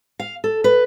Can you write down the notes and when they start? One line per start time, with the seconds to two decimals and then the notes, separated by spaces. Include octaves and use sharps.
0.19 F5
0.44 A4
0.64 B4